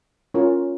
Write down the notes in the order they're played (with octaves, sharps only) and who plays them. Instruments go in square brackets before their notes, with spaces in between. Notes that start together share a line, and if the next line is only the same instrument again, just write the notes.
[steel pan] C#4 F4 A#4 C#5